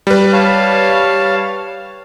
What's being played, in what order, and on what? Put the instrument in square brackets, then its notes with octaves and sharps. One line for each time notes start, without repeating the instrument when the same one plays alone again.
[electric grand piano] G3 B4
[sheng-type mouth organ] C#5 F5 A5